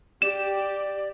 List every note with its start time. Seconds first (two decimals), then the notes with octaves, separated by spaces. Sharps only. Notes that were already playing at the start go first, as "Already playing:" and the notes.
0.22 G4 D5 E7